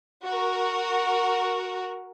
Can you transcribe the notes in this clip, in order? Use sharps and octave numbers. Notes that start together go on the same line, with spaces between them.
F#4 A#4